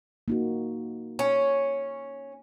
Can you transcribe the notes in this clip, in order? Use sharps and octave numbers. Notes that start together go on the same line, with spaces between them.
A#3 D#4 F#4
C#4